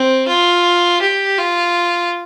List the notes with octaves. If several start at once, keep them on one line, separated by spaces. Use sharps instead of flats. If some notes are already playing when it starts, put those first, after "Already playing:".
Already playing: C4
F4
G4
F4